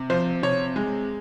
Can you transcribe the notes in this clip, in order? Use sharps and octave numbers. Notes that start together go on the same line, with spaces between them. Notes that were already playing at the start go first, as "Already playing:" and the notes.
Already playing: C3
F3 C5
C3 C#5
G#3